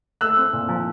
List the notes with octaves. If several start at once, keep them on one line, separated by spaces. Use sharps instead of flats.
A3 E6 F#6
C4
A#2
F3